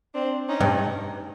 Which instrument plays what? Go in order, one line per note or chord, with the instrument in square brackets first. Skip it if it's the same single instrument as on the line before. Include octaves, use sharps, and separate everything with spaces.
[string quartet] C4 D4
C#4 D#4
[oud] G2